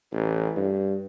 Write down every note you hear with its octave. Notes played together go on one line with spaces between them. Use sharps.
A1
G2